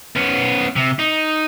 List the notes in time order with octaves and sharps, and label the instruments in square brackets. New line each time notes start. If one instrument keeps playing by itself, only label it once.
[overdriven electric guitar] B3 C#4
C3
D#4